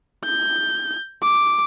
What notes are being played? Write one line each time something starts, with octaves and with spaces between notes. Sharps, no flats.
G6
D6